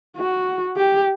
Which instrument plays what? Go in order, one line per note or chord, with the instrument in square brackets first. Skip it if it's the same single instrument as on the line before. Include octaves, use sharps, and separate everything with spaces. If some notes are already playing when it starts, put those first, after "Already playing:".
[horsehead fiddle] F#4
G4